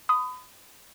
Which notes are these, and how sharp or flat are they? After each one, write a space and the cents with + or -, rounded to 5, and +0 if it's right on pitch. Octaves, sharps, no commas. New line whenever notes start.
B5 +35 D#6 +0